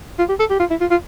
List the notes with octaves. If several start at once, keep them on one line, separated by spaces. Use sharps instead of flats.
F4
G4
A4
G4
F4
E4
F4
F4